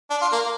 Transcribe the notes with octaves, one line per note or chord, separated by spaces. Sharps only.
D4
F4
A#3